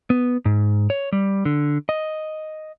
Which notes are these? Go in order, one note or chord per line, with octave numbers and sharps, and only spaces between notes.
B3
G#2
C#5
G3
D3
D#5